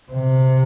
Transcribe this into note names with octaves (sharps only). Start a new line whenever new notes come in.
C3